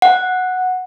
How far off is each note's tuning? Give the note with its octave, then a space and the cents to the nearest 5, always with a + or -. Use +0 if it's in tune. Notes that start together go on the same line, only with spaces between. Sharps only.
F#5 -5